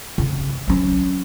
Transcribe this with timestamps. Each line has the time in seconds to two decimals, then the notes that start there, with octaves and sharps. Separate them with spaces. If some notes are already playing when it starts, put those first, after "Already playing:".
0.18 C#3
0.68 F#3 C#4